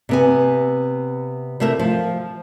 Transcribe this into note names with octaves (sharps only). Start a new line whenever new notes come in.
C3 B3 G#5
C3 A3 E4 A#4 E5
F3